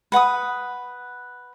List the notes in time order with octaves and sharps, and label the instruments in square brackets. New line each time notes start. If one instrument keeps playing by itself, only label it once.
[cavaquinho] B4 F#5 B5 D#6